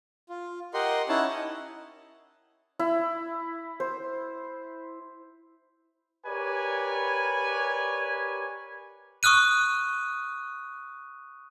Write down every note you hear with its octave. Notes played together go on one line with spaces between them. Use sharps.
F4
G4 A#4 D#5 F#5 C6
C#4 D#4 E4 C#5 F#5 A5
D#5
E4
C5
G4 A#4 B4 C#5 D5 G#5
C#6 D#6 F6 F#6 D#7